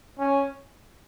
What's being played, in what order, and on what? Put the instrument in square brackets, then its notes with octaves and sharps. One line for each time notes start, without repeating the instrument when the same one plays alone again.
[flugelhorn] C#4